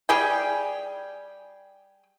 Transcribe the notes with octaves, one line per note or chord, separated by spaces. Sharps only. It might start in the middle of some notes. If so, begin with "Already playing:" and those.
G3 G#4 G5